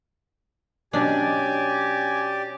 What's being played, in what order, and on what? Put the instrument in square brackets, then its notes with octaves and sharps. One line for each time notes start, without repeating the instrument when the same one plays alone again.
[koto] B2 D4 [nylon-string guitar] F#3 C#4 D#5 [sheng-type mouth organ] G4 D5 [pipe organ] G#5